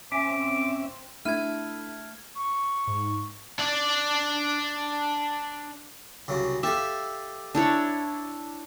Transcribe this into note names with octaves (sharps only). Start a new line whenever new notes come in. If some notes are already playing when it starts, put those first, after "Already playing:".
C4 C#4 E5 D6
A3 D4 E4 F6 G#6 D#7
C#6
G#2
D4 D5
C2 C#3 F#3
G4 A4 E5 F5
D4 E4 C#5